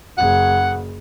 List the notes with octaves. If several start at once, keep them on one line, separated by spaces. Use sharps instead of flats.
F#1 C#3 F#5